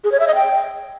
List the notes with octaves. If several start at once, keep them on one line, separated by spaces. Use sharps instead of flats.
G#4
C#5
E5
D#5
G5